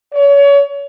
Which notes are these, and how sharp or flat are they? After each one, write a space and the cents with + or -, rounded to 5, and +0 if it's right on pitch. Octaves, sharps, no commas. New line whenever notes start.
C#5 +30